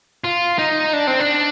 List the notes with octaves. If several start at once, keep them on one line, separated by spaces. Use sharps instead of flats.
F4
D#4
D4
C4
D4